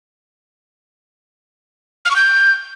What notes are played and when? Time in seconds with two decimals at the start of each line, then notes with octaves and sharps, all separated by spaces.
2.05 F6
2.11 C#6
2.16 G6